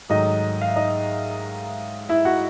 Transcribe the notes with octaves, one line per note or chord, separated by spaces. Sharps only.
G#2 D#3 F#3 A3 D#4 D#5
F5
E5
D#4 D#5
E4 E5
F#4 F#5